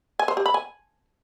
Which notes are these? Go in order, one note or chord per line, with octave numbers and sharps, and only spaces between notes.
G#5
C5
G4
B5
G#5